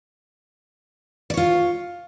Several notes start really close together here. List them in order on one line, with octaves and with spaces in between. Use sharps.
D5 C#5 F4